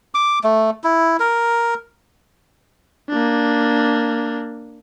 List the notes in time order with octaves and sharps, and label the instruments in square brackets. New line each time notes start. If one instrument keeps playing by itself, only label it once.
[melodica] D6
A3
E4
A#4
[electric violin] A#3 D4